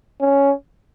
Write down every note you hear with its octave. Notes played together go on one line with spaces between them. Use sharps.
C#4